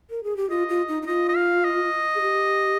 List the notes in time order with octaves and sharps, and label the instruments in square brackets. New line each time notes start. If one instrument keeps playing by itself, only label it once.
[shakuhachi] A#4
G#4
G4
[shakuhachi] F4 [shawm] D#5
[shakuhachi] F4
D#4
D#4
[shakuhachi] F4 [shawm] D#5
[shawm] D#5
F5
D#5
[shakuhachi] G#4
G4